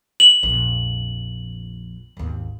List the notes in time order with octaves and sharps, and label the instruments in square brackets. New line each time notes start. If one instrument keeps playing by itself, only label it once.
[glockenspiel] F#7
[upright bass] A#1 F2
G#1 D#2